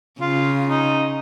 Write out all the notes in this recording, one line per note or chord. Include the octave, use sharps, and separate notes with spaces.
C#3 F4
D#4